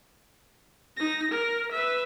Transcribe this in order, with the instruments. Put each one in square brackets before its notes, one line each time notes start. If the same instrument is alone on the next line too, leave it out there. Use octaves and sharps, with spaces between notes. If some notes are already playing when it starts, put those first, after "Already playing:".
[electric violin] D#4 A#6
A#4
B4 E5